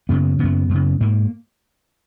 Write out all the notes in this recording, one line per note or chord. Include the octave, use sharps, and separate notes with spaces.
F#2 C#3 B3
F#2 C#3 B3
F#2 C#3
G#2 A#3